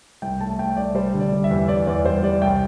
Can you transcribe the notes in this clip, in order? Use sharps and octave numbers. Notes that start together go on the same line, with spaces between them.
C2 G5
A3 A5
A3 G5
C2 D5
G3 C5
D3
D5
G3
E5
E2
E2 D5
E2 D5
G3 C5
G3 D5
C2 G5